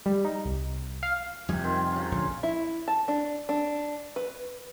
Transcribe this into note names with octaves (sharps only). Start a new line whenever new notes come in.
G3
D#4
C2
F5
F2 C3 G3 E5 G#5
D#3 C4 F4
C#3 F#3 F4
A#1 D3
E4
A5
D4
D4
B4